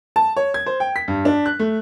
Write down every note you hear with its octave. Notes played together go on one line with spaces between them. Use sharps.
A5
C#5
G#6
C5
G5
B6
G2
D4
F#6
A3